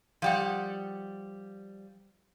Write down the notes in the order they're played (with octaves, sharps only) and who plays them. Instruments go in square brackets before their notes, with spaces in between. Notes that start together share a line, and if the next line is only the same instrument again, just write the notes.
[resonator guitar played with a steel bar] F3 G3 F#5